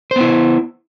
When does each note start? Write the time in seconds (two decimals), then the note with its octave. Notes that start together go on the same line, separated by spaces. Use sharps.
0.11 C5
0.16 B3
0.21 E4